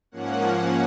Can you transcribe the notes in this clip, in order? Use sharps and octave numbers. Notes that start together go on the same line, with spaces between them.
G#2 F3 A#3 C#4 F#5